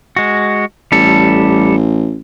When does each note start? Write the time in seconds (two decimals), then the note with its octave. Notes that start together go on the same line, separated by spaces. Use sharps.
0.16 G#3 F#4
0.92 A1 G3 A4